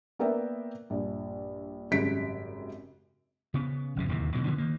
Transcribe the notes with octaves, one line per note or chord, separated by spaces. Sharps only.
A#3 B3 A#4 D5 E5 G5
A#1 G2
G#1 F#2 C#3 G3 B6 D7
C#3 B3
G1 F#2 C#3
D1 D#2 A2 C3
B2 D3 D#3 F#3
D3 E3 F3 B3
D#3 A#3